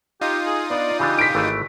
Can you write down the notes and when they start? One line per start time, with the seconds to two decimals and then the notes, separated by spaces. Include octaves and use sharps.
0.21 D#4 F4 G4 D#6
0.46 G#4
0.70 B3 D4 D5
0.99 C#3 E3 D4 G4
1.19 B6 D7
1.35 G#1 E3 A3